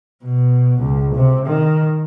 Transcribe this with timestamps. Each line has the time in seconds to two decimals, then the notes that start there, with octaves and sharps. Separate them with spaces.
0.24 B2
0.79 C#2
1.15 C3
1.46 D#3